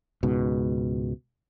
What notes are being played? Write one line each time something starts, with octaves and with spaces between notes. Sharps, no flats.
C#2 G#2 B2